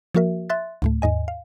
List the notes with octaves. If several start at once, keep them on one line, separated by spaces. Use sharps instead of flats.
F3 A#3 F#4 A#4 E5
E5 C6 F#6 A6
D2 A2 A3
D#2 G#2 D#5 G#5
F5